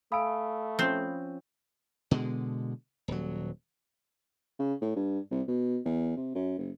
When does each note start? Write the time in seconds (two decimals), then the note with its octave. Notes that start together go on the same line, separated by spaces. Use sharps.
0.12 A3 F5 G#5 B5 D#6 E6 D7
0.79 F3 C4 C#4 C5
2.11 B2 D3 G#3
3.08 D#1 F#3
4.59 C#3
4.82 A2
4.96 G2
5.31 C2
5.48 B2
5.86 E2
6.17 C3
6.35 F#2
6.58 F#1